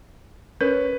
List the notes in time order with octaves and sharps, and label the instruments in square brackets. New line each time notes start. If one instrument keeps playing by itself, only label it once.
[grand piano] C#4 [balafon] A#4 [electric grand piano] B4